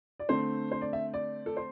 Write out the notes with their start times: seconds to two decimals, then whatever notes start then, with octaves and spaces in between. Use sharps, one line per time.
0.20 D5
0.29 D3 A3 C4 C5
0.72 C5
0.81 D5
0.93 E5
1.14 D5
1.46 A4
1.57 C5